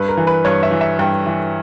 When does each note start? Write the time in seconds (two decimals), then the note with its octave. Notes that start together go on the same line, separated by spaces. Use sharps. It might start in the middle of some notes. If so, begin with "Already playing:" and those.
Already playing: G2 B4
0.08 A#4
0.17 E3
0.27 B4
0.45 G2 C#5
0.63 E5
0.71 E3
0.81 E5
0.99 G2 G5
1.26 E3